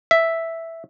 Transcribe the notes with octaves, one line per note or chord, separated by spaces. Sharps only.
E5